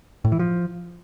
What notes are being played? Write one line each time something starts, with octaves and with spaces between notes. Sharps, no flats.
A2
E3
F3